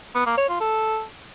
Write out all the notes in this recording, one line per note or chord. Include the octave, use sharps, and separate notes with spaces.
B3
A#3
C#5
F4
A4